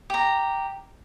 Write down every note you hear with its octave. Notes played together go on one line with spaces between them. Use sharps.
G4 A#5